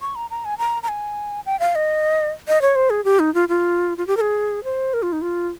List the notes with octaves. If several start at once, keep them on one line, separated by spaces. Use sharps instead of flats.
C#6
A#5
A#5
G#5
A#5
A#5
G#5
G5
F5
D#5
D#5
C#5
C5
G#4
G4
D#4
F4
F4
F4
G4
A#4
G#4
C5
A#4
F4
D#4
F4